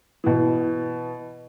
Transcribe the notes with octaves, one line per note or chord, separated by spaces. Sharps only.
B2 E3